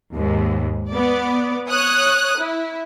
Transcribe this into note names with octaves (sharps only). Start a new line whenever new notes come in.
D#2 G#2
B3 D5
C#5 D#6 F#6
E4